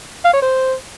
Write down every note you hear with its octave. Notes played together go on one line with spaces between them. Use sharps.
F5
C#5
C5